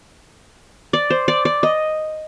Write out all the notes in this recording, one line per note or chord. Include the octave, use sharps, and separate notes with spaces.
D5
C5
D5
D5
D#5